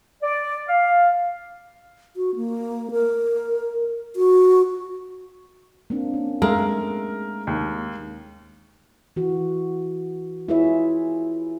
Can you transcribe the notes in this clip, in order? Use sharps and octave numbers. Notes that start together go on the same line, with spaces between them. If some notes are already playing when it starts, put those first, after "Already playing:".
D5
F5
F#4
A#3
A#4
F#4
A#3 C4 D4
C#4
G#3 A3 A#4 E5 F5
D#2
E3 F#4
E4 F4 G#4 B4 C#5 E5